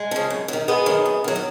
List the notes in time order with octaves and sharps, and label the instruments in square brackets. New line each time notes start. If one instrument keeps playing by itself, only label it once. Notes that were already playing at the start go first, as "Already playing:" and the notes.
Already playing: [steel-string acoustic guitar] G#3
C#3 F3
F#2
F#3
D#3
F#2 G#3 B3
D#3 F#3
F#2
D#3 F#3
B3